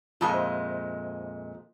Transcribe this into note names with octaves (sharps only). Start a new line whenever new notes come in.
F2 A#2 G#3 F4 A5 D#6
C5 D#5 E5